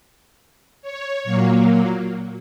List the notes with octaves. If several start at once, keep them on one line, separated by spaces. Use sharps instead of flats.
C#5
A#2 F#3 A#3